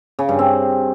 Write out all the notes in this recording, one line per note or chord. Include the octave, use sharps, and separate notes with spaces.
C#3
G2
C4